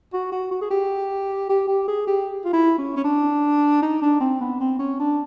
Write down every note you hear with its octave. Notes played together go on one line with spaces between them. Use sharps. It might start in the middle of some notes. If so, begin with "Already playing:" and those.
F#4
F#4
F#4
G#4
G4
G4
G4
G#4
G4
F4
E4
C#4
C#4
D4
D#4
D4
C4
B3
C4
C#4
D4